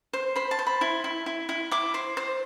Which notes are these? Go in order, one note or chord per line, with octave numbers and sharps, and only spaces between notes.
C5
C5 B5
A5
C5
B5
E4 C6
E4
E4
E4
E4 D6
C5
C5